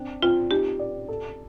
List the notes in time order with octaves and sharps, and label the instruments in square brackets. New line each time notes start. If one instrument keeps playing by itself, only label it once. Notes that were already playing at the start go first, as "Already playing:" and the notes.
Already playing: [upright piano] C4 D4
[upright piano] C4 [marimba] F4
[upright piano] D#4 [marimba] G4
[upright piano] D5
A4